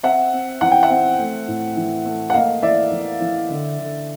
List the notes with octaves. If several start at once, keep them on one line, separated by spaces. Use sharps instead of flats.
C4 E5 F#5
C4
E3 F#5
G5
E5 F#5
C4
A3
A2
E3
A3
F#5
A#3 D#5 F5
E3 D5 E5
E3
E3
D3
D3